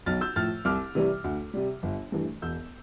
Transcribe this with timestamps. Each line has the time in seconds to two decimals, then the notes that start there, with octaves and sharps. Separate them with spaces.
0.06 B1 F6 A6
0.21 E6 G6
0.36 A2 F3 F6 A6
0.65 C2 D6 F6
0.95 C3 E3 G3
1.24 D2
1.54 C3 G3
1.83 G1
2.12 G2 E3 A3
2.42 E1 E6 G6